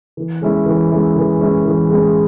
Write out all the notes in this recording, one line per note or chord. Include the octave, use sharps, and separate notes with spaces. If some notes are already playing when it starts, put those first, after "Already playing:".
E3
G#3 C#4 E4
E3
G#3 C#4 E4
E3
G#3 C#4 E4
E3
G#3 C#4 E4